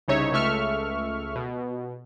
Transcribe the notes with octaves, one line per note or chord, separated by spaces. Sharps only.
C2 C#3 D#4 C#5 E5
C#2 A3 E5 C#6 F6
B2